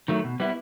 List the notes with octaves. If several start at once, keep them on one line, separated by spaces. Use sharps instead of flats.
D#3 F#3 A3
B2
G3 B3 E4